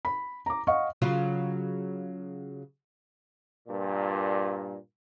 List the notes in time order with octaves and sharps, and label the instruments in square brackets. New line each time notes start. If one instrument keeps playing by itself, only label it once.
[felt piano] B5
A#5 D6
D#5 F5 F#5 C#6
[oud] C#3 F#3 F4
[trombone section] G2 A#2